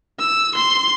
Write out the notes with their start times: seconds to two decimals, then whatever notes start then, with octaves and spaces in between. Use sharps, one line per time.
0.19 E6
0.55 C6